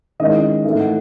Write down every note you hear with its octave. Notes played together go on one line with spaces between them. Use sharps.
D#3 G#3 C#4 E4 D#5
A2 E3 A3 D#4 E5
F#5